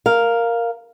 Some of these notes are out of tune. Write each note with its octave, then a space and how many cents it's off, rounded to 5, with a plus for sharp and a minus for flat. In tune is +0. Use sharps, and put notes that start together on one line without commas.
A#4 +0 F5 +0